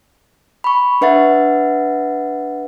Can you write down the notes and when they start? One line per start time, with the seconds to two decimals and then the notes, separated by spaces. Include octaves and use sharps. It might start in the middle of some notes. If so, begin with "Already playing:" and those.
0.64 B5 C#6
1.01 D4 B4 E5 F#5 A6